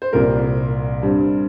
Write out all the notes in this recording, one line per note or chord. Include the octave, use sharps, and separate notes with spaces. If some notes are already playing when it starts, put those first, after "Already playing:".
C5
C2 A#2 G3 A#4
G2 G3 C4